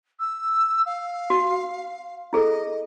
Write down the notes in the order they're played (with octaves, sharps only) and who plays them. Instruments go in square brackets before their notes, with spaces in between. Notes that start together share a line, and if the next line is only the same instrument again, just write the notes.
[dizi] E6
F5
[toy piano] F#4
[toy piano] E4 G#4 A4 [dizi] D#5